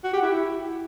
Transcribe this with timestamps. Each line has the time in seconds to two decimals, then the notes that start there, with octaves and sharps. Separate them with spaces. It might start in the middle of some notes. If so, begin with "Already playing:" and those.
0.04 F#4
0.13 G4
0.22 E4